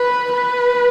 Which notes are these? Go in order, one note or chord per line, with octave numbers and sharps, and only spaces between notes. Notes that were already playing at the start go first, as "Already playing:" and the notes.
Already playing: B4
B4